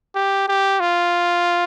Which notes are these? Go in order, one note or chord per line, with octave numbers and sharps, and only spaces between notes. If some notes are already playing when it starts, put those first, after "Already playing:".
G4
G4
F4